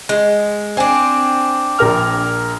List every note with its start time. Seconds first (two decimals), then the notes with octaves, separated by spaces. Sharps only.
0.09 G#3
0.77 C4 D4 G#5
1.79 A#1 A#4 F6